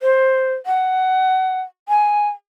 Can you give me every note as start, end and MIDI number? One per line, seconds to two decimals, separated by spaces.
0.01 0.54 72
0.66 1.61 78
1.89 2.29 80